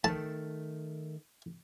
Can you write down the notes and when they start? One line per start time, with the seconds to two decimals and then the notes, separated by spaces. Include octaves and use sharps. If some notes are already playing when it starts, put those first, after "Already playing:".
0.04 D#3 A3 A5